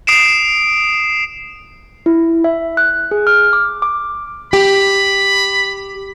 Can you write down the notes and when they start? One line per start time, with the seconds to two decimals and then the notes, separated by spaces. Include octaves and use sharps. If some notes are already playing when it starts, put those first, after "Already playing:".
0.07 D#6 C7 D7 E7
2.06 E4
2.44 E5
2.77 F#6
3.11 G#4
3.27 F6
3.53 D6
3.82 D6
4.53 G4 B5